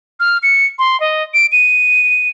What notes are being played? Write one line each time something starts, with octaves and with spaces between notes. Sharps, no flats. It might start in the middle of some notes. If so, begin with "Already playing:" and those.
F6
C#7
C6
D#5
D7
D#7